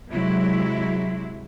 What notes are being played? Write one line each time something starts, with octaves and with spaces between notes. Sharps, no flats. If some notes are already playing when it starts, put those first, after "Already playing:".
C3 F#3 G#3 E4